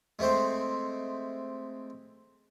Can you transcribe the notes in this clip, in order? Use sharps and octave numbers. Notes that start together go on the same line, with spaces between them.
G#3 A3 C4 C5